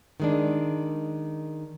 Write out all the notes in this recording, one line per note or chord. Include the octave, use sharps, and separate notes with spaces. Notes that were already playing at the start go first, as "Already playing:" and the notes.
D#3 G#3 D4